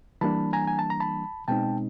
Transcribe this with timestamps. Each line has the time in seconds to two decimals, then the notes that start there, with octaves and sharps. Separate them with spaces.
0.21 E3 G3 A#3 D4 A5 B5
0.53 G#5 A#5
0.68 G#5
0.79 A5
0.90 A#5
1.00 A5 B5
1.48 B2 G#3 C4 D#4 G5 A5